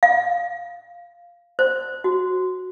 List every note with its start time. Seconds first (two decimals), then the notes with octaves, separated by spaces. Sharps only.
0.03 F5
1.59 C5
2.04 F#4